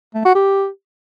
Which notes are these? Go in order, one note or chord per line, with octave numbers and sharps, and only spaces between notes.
A3
F#4
G4